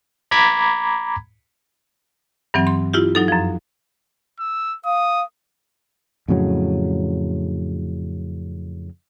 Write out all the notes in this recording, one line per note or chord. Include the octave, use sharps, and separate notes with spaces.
A#5 B5 D6 G#6 B6
G2 E3 F#3 C4
C6
E4 F4 G4
F#3 D#4 A4
F#2 F3
E6
F5 D#6
F2 A2 C#3 F#3